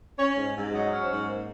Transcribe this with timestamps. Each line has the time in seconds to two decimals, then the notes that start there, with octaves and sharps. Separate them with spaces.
0.19 C#4 C#5
0.37 G#2
0.55 G#2
0.73 F#3 D#5
0.92 C#4
1.01 C5
1.10 G#2
1.28 A#3 C5